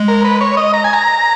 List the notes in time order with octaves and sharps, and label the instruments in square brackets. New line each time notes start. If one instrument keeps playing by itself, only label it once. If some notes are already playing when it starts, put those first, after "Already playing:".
Already playing: [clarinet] G#3
[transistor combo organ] A#4
B4
C#5
D#5
A#5
G#5
A#5